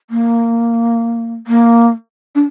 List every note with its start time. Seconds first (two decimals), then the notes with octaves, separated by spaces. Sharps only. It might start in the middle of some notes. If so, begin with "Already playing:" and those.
0.10 A#3
1.47 A#3
2.35 D4